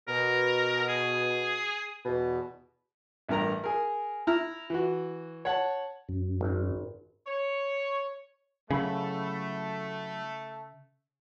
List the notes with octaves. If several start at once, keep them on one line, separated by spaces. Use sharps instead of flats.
B2 A#4
G#4
E2 B2
A1 G2 A#4 A#5
G#4 A#4
E4 A#5 F6
E3 F#4
C#5 F#5 A5
F#2
G#1
C#5
C#3 F#3 A3 E4 B5